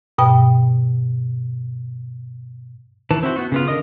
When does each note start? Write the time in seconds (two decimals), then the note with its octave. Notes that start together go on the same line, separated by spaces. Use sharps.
0.18 G2 B2 G5
3.11 D#3 E3 B4 A5
3.23 C4 E4 F#4 C5
3.36 B3 F#4
3.52 C#3 B3 F4
3.68 D3 A#4 D#5 D#6